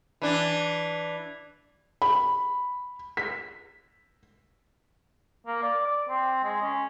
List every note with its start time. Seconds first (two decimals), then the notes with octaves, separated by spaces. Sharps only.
0.22 E3 D4
2.02 B5
3.17 B6
5.47 A#3
5.63 D5
5.86 D5
6.09 C4
6.43 G#3
6.62 C#4